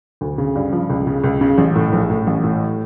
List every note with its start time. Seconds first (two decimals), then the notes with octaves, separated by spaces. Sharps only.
0.21 D2
0.38 C#3
0.55 G2
0.72 F3
0.90 C#2
1.07 C#3
1.24 C#2
1.41 C#3
1.58 A1
1.75 A2
1.93 A#1
2.10 A2
2.27 A1
2.43 A2